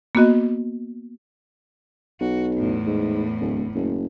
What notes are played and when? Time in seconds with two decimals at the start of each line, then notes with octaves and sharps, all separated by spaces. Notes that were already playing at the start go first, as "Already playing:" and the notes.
0.15 A#3 B3 F#4 D#5
2.20 B1 F#4
2.56 E2 A2
2.86 G#2
3.40 D1
3.75 F#1